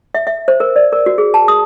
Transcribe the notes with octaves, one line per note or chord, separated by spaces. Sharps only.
E5
E5
C5
A#4
D5
A#4
F#4
G#4
A5
D#6